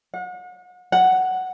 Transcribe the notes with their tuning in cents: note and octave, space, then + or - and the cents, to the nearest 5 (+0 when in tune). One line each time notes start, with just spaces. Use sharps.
F#5 -40
F#5 +10